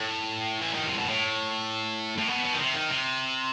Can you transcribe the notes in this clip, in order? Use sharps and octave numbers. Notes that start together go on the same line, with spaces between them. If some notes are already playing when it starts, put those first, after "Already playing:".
Already playing: A2
E3
D#3
C3
B2
A2
A2
B2
B2
D#3
C3
D#3
C3